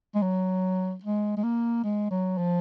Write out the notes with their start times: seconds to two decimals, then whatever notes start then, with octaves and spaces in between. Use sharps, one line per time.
0.15 G#3
0.22 F#3
1.03 G#3
1.37 G#3
1.43 A#3
1.84 G#3
2.11 F#3
2.38 F3